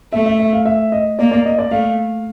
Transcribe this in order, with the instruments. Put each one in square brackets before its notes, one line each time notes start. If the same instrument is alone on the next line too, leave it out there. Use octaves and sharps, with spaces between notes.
[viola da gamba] A3 [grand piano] E5
[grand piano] E5
E5
F5
E5
D#5
[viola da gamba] A#3 [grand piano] D5
[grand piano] D5
D#5
D5
[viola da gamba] A3 [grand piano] F5